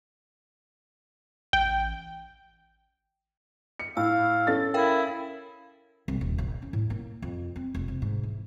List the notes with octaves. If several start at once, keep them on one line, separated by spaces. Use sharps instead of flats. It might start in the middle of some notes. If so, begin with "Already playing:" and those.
A1 G5
C#7
A2 F5 E6
C#4 A4 A6
E4 A#4 F5 G5
C2
D#1
A1
C#4
A2
A#3
F2
C4
F1
C3
G#2
E3